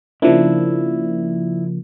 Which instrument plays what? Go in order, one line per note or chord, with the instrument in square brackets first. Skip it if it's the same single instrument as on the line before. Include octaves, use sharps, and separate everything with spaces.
[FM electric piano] C#3 F3 A#3 [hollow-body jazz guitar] D4 E4